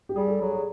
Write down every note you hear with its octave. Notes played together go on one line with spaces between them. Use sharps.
G4
G3 G#4
A4
F#3 G#4
G#4